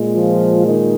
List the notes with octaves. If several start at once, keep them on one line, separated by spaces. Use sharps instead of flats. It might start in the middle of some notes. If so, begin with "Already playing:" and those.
Already playing: A#2 G#3
F3 F4
D#3 D#4